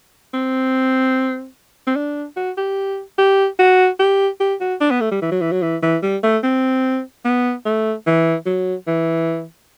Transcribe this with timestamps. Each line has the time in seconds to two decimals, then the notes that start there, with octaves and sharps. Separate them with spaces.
0.34 C4
1.87 C4
1.96 D4
2.37 F#4
2.57 G4
3.18 G4
3.59 F#4
3.99 G4
4.40 G4
4.61 F#4
4.81 D4
4.91 B3
5.01 A3
5.11 G3
5.22 E3
5.32 F#3
5.41 E3
5.52 F#3
5.62 E3
5.83 E3
6.03 G3
6.23 A3
6.43 C4
7.25 B3
7.65 A3
8.07 E3
8.46 F#3
8.87 E3